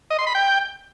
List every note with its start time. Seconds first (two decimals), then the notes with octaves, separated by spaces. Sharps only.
0.10 D#5
0.19 C6
0.27 B5
0.35 G5